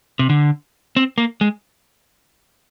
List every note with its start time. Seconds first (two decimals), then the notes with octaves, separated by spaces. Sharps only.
0.19 C3
0.30 D3
0.96 C4
1.18 A#3
1.41 G#3